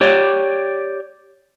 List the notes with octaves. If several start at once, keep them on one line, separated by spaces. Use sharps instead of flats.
G4 C#5 D5